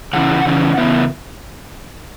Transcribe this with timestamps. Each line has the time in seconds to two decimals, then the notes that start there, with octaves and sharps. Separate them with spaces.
0.13 C#3 E3 C#4 E4 F#5
0.45 C#3 E3 C#4 E4
0.78 E2 C#3 B3 E4